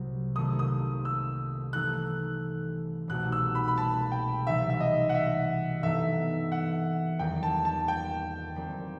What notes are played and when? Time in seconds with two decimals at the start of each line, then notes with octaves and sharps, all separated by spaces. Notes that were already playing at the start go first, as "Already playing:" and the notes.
Already playing: C2 C3 F#3
0.36 C3 D#3 A3 D#6
0.59 D#6
1.05 E6
1.73 E3 A3 D#4 A4 F#6
3.08 C2 B2 A3 D#4 G4 F#6
3.32 E6
3.55 B5
3.68 B5
3.78 A5
4.12 G5
4.47 C3 E3 G3 D#4 E5
4.70 E5
4.80 D#5
5.09 F#5
5.14 E5
5.82 G2 E3 B3 D#4 A4 E5
6.52 F#5
7.19 E2 D#3 G3 D#4 G5
7.43 A5
7.65 A5
7.88 G5
8.56 D#3 G3 C4